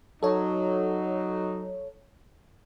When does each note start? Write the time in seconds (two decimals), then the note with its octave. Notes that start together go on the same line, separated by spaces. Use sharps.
0.23 F#3 D#4 A4 C#5